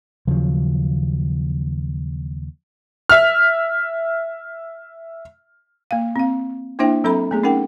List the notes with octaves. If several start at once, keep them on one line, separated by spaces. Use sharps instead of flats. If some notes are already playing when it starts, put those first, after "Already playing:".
D#2 C#3 F3 F#3
E5 F6
A#3 F5
C4 F5
A#3 D4 E4 C5 E5 G5
F#3 C4 A4 E5 A#5 B5
A3 B3 G#4
C#4 D#4 A#4 F#5 G5